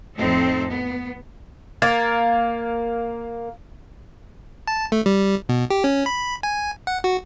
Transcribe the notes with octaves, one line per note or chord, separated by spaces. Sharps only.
F2 A2 C4 D#4 A4
B3
A#3 F5 G#6 A6
A5
A3
G3
B2
G4
C#4
B5
G#5
F#5
F#4